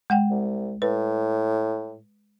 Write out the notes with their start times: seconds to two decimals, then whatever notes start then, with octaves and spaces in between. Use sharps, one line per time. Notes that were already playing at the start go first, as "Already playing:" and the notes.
0.10 G#3 F#5 G5
0.31 C2
0.82 A2 B4